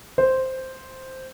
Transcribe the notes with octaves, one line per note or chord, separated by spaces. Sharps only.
C5